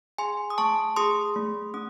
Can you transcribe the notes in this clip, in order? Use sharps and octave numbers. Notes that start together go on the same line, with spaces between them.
G#4 G#5 C6
D#6
A3 A5 C#6
G#4 C6 D#6
A3
C#4 D#6